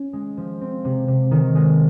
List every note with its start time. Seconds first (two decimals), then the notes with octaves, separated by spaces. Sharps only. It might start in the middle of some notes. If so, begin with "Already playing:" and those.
Already playing: C#4
0.13 G#3
0.37 F3
0.61 C4
0.85 C3
1.08 C3
1.31 D#3
1.55 G#3